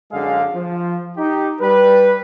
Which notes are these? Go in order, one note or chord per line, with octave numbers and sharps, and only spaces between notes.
F#2 D3 G#3 G#4 F5
F3
D#4 G4
G3 B4